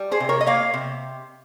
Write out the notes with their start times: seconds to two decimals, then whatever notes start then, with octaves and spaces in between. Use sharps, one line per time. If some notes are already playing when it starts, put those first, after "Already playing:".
Already playing: G3
0.11 G#4 C5
0.20 C3
0.29 A#4 C#5
0.41 D#5
0.46 A#3 C#5 F5
0.74 C3